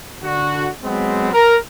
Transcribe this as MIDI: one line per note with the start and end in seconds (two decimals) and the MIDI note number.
0.23 0.69 50
0.23 0.69 66
0.83 1.30 54
0.83 1.30 56
0.83 1.30 59
0.83 1.30 60
1.33 1.56 70